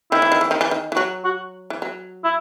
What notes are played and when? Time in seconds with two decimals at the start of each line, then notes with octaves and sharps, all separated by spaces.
0.12 D#3 E4
0.22 E3
0.32 D#3
0.41 E3
0.51 D#3
0.61 E3
0.71 D#3
0.92 E3
0.96 F#3 F#4
1.25 F#4
1.70 E3
1.82 F#3
2.24 E4